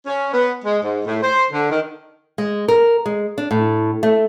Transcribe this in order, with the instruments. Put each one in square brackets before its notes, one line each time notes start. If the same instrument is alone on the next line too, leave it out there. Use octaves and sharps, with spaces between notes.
[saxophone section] C#4
B3
G#3
G#2
A2
C5
D3
D#3
[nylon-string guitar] G#3
A#4
G#3
D4
A2
A3